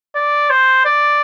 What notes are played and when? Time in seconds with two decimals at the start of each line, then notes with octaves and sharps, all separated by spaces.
0.16 D5
0.50 C5
0.86 D5